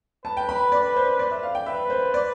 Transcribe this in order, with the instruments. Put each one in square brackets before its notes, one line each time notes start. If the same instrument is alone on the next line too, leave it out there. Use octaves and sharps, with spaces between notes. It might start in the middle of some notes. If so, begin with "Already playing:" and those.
[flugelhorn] B4 [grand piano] A5
[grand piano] G5
B5
D5
C5
D5
E5
F5
G5
[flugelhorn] B4 [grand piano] E5
[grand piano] C5
D5